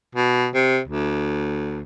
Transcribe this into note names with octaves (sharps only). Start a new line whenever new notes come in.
B2
C3
D2